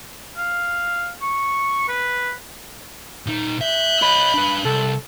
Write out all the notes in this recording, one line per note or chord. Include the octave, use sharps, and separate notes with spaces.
F5
C#6
B4
A#2 D#4
E5 F#6 G6
C#5 D#5 B5
D4 B4
C2 A4